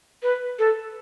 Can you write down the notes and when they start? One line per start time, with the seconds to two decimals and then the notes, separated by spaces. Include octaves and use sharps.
0.23 B4
0.59 A4